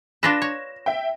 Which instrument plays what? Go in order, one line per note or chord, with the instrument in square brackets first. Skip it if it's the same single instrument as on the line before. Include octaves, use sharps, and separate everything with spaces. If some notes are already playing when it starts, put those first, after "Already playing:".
[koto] D4 F4 B4 [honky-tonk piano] A#6 E7
[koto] C#5
[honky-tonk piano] E5 G5